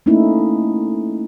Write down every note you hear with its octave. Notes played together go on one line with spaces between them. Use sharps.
A3 A#3 C#4 D#4 E4